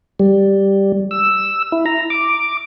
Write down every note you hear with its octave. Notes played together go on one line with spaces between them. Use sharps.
G3
E6
E4
A#5
D6